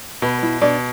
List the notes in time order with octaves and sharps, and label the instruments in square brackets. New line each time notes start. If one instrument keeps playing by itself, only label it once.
[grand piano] B2 [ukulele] B4
[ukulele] E4 E5
[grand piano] B2 [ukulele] D4 D5